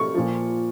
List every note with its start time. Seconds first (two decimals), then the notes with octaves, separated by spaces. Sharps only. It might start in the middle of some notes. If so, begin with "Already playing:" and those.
Already playing: C#6
0.15 A#2 F3